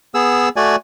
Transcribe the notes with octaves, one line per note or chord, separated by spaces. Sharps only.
B3 G#4 E6
A3 F#4 D5 G#5